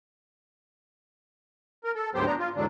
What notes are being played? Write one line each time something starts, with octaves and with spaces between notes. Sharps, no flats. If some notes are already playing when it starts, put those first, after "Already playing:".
A#4
A4
D2 G#2 F#3 B3 G4 C5
B3 D4 A#5
F4
E2 G#2 D3 F#3 D4